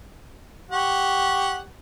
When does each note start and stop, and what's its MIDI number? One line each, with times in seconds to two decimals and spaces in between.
0.71 1.61 67
0.71 1.61 78
0.71 1.61 85